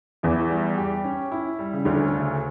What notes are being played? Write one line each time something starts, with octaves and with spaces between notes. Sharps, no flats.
E2 E3 E4
G3
G4
C#4
E4
G3
C#3
D2 D3 C#4
C#3